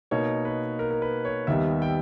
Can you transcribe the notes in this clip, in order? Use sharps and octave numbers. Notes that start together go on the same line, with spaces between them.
B2 A#3 D#4 C#5
B4
A#4
A#4
B4
C#5
D#2 D#3 G3 B3 D#4 E5
G5